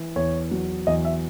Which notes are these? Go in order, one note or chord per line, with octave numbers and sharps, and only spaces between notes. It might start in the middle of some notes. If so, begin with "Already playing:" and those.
Already playing: E3
E2 C#5
F#3
E2 D#5
E5